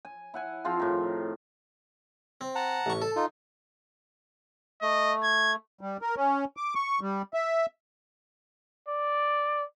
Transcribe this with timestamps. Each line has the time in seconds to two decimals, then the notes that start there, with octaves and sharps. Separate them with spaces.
0.05 G#5
0.34 E4 F#5 G#5
0.64 F3 C4 F4 G#4
0.80 A2 D#3
2.41 C4
2.55 F#5 A5 A#5
2.86 A1 C#6
3.02 A4 A5
3.16 D#4 F4
4.82 A3 D#5
5.23 G#6
5.81 G3
6.02 A#4
6.16 C#4
6.57 D6
6.75 C#6
7.01 G3
7.34 E5
8.88 D5